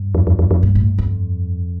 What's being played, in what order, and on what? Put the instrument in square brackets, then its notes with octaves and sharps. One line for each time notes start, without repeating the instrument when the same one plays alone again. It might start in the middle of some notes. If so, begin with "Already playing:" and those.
Already playing: [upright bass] G2
[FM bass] F2
F2
F2
F2
[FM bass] G2 [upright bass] A#2
[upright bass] A2
F2